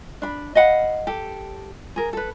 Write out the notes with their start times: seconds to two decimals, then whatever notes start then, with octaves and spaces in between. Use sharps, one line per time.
0.22 D4 B5
0.55 D#5 F5 F#5 B5
1.07 G4 A4
1.96 G#4 A#4
2.13 A4 B4